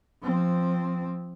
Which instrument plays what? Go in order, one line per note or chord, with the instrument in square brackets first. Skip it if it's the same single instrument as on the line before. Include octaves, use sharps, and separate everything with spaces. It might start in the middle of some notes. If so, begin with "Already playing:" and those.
[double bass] F3 C4